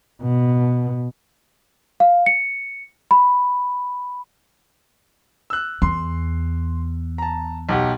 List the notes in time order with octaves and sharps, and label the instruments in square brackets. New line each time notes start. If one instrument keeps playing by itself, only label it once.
[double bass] B2
[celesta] F5
C#7
B5
[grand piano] E6 F#6
[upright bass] E2 [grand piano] C6
[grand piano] A5 A#5
B1 G4 F#5